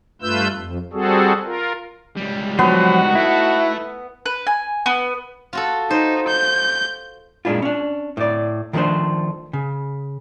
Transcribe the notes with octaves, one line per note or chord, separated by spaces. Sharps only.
G2 A3 F4 B4 E6 G6
F2
G3 C4 F#4 G#4 A4
F4 A#4
C#2 G3
F3 F#3 B3 D#4 F#4 C5
A3 E4 A4
B4
G#5
B3
F4 F#4 A4
D#4 C5
G6
A#2 G#3 C4 D4 E4 F4
C#4 D4
A2 D5
D#3 F3 G3 A3 D4 C5
C#3